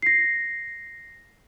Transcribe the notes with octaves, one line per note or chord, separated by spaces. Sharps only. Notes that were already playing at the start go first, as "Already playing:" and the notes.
A#6 C7